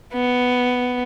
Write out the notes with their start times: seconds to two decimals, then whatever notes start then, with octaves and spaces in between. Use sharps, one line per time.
0.13 B3